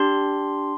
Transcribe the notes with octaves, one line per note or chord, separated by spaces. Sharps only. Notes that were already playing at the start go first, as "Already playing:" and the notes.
Already playing: D4 G4 C6